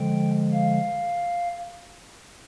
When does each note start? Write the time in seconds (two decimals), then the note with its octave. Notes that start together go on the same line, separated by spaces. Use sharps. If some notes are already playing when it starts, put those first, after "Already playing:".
Already playing: D3 F3 G#3 G5
0.52 F5